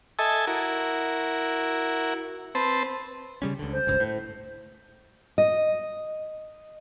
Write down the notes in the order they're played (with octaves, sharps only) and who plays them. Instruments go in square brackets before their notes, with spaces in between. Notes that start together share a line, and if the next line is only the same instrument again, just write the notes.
[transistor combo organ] A4 D#5 E5 G#5 A5
E4 F#4 A#4
C4 B4 C5 A5
[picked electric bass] C#3 G3 C#4
C#2 D3
[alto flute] C5
[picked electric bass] G1 C#2
A2
[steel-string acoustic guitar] D#5